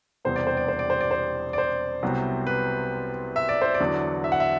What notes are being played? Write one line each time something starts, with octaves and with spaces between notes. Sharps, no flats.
E1 E2 C3 G3 B3 C5
D5
C5
D5
C5
D5
C5
D5
C5
D5
C5
C2 C3 F#3 B3
B4
E5
D5
C5
D5
E2 D3 F#3
E5
F#5
E5